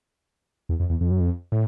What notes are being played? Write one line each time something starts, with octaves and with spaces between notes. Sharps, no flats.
E2
F2
E2
F2
F#2
F2
A2